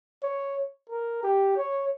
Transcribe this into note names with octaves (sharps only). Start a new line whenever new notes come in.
C#5
A#4
G4
C#5